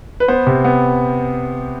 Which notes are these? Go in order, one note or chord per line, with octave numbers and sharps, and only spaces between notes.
B4
B3 C5
C3
B3